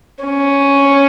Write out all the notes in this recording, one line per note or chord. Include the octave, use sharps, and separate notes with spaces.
C#4